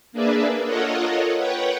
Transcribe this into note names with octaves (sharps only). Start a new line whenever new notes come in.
A#3 D4 G#4 B4 D5 E5
F4 A4 A#4 C#5 D#5 F#5
B4 C#5 F#5 G5